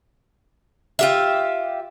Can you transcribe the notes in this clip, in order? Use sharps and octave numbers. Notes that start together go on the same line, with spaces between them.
F4 G4 E5